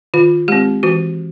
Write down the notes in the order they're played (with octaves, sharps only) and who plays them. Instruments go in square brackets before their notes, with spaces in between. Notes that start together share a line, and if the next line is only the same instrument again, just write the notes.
[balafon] D#3 F4
G#3 C4 G4
E3 F#4